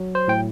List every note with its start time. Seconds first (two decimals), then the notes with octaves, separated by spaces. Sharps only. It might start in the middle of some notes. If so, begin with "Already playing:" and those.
Already playing: F#3
0.15 C5
0.28 A2 G5